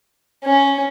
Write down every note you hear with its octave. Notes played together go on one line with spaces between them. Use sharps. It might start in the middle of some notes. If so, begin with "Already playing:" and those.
C#4